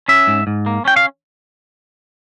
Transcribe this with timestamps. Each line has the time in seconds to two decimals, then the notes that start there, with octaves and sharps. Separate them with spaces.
0.08 C#4 E5
0.27 G#2
0.47 G#2
0.66 A#3
0.85 C#4 G5
0.96 F5